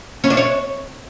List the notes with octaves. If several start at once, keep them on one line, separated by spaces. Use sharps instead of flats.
C#4
D4
C#5